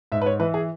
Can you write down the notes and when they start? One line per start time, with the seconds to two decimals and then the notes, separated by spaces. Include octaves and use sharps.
0.12 G#2 E5
0.22 B4
0.26 C#5
0.40 E3 B4
0.54 G#4